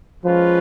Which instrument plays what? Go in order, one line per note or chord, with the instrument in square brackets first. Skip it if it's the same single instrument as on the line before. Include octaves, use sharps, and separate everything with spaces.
[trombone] F3 [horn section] G#3 C#4 F4 B4